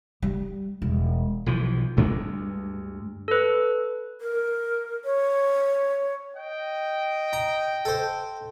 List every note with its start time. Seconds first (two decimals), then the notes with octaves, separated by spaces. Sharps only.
0.22 G3
0.82 E1
1.46 B1 E3 F3
1.97 D2 G2 G#3 D4
3.28 A4 B4
4.20 A#4
5.05 C#5
6.37 D#5 G5
7.33 A#5
7.85 A4 C5